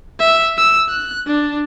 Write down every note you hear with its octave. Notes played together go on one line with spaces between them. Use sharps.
E5
E6
F#6
D4